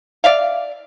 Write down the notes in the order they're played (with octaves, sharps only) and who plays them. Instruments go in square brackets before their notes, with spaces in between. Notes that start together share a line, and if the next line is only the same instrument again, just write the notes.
[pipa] D5 E5 F5